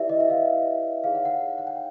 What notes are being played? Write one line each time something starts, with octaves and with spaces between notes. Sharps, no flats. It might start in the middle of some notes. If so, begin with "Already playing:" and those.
Already playing: E4 G4 B4 D5 E5
D#5
E5
F5
D#4 G#4 C#5 F5
F#5
F#5
F#5
G5